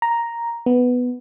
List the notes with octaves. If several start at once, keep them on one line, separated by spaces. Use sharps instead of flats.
A#5
B3